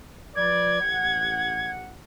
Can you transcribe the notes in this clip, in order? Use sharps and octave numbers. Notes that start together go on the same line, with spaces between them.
F3 B4 D5 G#6
A1 G4 F#5